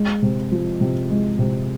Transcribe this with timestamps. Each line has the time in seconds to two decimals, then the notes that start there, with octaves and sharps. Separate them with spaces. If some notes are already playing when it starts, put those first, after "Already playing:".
Already playing: G#3
0.22 C3
0.52 F3
0.81 C3
1.10 G#3
1.39 C3